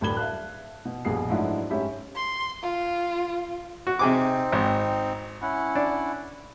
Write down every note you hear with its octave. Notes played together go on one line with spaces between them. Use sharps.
D1 G2 B5 G#6 G7
E5 F5 A5 F#6
B2
A#1 B2 G3 G#4 C7
G#2 F3 F#3 A3 D4 E4
G#2 C#4 G4 E5 B5
C6
F4
F#4
C3 C4 D#4 G#4 D6
G#1
C#4 E4 F#5
D4